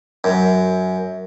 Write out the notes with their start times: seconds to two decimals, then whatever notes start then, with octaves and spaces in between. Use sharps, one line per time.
0.24 F#2